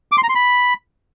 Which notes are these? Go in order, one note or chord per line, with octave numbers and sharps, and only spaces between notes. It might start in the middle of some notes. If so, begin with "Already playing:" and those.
D6
C6
A#5
C6
B5